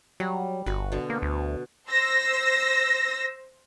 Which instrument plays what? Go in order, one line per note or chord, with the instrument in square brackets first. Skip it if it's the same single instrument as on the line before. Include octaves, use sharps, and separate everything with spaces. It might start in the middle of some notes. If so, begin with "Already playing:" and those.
[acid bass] F#3 [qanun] G3
[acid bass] G1 [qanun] F#4 B4
[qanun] B2 D3
[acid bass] A#3
D2
[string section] C5 E6 A#6